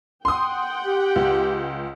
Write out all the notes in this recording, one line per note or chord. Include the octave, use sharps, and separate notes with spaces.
F#5 G5 C6 D#6
G4
C#2